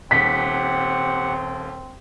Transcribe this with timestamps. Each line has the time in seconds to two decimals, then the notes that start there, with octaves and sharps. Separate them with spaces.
0.11 D#1 D#2 C4 G4 F#5 B6